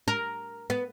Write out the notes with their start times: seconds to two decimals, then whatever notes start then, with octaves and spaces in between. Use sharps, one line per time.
0.08 A#4
0.70 B3